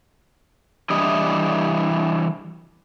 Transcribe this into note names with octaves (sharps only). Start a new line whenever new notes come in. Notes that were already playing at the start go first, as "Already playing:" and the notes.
E3 G3 D4 E4 D#5